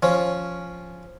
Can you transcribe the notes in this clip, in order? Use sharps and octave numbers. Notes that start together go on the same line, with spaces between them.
F3 C#4